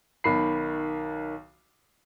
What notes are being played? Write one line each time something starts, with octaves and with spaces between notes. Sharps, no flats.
B1 D#3 B5 C7